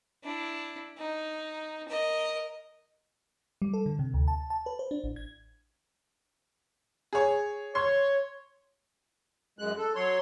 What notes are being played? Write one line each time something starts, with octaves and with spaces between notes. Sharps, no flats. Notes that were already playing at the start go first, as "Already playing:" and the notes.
D4 E4
D#4
A#4 D#5
G3
A4
D3
C3
D2
A5
A5
B4
C5
D4
A1
G#6
G#4 C#5
C#5 C6
F#2 G#3 F#6
A4
F#3 C#5 C6